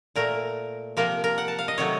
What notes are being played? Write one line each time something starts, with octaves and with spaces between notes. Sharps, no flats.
A#2 A3 A#4
C3 F3 A#3 A#4
A#4
F#5
A5
F5
D#5
C3 D#3 F#3 A3 C#5